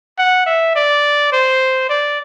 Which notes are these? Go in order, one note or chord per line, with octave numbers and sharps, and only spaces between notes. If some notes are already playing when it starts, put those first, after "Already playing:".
F#5
E5
D5
C5
D5